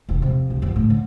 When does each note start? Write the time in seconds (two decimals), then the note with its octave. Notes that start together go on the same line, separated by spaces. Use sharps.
0.09 E1 B2
0.22 C3 F3
0.50 C2
0.62 G1 F2
0.76 A2
0.90 D3